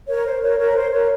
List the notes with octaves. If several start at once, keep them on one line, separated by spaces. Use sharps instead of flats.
A#4 C#5
C5
A#4 C#5
A#4 C#5
C5
A#4 C#5